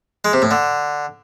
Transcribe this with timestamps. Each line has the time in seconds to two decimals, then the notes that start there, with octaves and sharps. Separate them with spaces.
0.25 G#3
0.33 C3
0.42 A2
0.51 D3